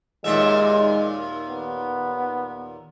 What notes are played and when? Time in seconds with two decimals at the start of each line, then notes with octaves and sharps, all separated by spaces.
0.24 D#2 A#2 G#3 E5
1.50 B3